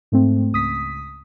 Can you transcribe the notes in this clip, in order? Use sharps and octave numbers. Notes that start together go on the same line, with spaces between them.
G#2 A3 C4
C#2 D#6 B6